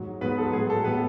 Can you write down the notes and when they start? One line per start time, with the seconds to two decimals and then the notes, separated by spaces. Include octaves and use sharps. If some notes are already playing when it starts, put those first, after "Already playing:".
Already playing: G#2 F#3
0.21 G#2 F#3 B3 B4
0.38 A4
0.53 A2 F#3 G#4
0.70 A4
0.85 A2 F#3 B3 B4